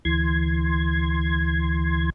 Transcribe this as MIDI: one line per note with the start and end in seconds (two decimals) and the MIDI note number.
0.05 2.10 38
0.05 2.10 52
0.05 2.10 84
0.05 2.10 92